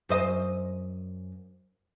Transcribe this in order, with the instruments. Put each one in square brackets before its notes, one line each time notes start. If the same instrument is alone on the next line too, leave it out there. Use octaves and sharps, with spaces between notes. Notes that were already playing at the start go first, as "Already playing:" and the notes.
[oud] F#2 C5 D#5